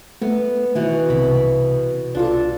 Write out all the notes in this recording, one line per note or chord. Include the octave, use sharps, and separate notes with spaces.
A3 B3
B2 D#3 E3
C2 C3 B5
C2 D4 F4 A4